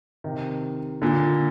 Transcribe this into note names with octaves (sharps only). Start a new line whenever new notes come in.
C3 D#3
A#2 D3